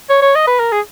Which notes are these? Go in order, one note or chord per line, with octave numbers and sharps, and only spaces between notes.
C#5
C#5
D#5
B4
A#4
G#4